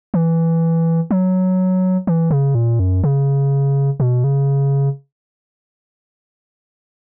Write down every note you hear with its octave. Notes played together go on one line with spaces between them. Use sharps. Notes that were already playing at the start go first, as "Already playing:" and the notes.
E3
F#3
E3
C#3
A#2
F#2
C#3
B2
C#3